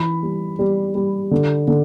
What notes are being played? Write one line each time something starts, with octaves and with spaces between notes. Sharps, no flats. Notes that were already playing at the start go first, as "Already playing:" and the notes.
Already playing: E3 B5
G3
G3
G3
D3
D3